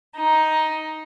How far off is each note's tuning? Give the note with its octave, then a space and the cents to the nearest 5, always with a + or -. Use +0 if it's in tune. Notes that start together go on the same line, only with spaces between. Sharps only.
D#4 +10